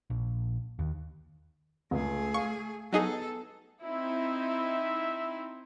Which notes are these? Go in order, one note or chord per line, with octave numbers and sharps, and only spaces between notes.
A#1
D#2
C#2 A3 G#4
F5 C#6
F#3 B3 D#4 G#4 A4
C4 D#4 E4 E5